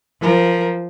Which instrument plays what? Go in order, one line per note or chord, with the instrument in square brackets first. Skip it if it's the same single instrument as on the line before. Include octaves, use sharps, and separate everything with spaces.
[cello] F3 [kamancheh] A#4